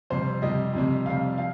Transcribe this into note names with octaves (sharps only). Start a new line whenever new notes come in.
F2 C3 G3 C5
F2 C3 G3 D#5
F2 C3 G3
F2 C3 G3 F5
F3 F5